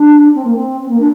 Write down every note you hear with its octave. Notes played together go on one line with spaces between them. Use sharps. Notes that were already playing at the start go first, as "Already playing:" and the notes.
Already playing: D4
C4
A#3
C4
C4
A#3
D4